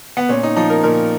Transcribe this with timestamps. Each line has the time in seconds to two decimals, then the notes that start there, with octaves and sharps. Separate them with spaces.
0.17 B3
0.29 A#2 C#4
0.43 D#4
0.56 F3 D#4
0.70 A#4
0.84 A#2 A#4